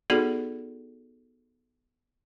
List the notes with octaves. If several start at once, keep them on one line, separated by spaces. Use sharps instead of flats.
B3 D#4 F#4 G#4 A4 D5